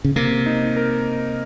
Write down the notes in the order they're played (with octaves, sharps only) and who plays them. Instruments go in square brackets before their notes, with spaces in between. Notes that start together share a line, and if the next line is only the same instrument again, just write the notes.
[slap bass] C#3
[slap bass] C3 [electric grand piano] A#3
[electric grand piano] D#4
A#4